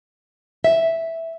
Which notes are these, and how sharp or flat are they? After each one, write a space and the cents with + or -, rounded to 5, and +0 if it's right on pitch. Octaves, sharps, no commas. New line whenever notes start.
E5 -5